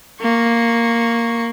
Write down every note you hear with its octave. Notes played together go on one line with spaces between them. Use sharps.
A#3 C#6